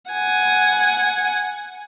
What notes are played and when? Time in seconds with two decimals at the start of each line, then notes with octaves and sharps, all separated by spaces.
0.11 F#5 G#5